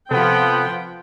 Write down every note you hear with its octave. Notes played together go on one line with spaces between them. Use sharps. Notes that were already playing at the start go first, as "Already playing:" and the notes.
C3 F3 B3 C4 A4 F#5 G5